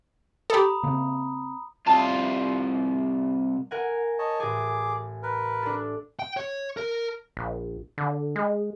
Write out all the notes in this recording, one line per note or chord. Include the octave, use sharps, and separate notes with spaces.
G4 A4 A#5 B5 D#6
C#3 A#3 C4
C2 F4 A5
A#4 F#5 G#5
C#5 D#5 A5
A1 G#4 G#5 D6
A#4 B4
D4 A4
G5
C#5
A#4
A#1
D3
G#3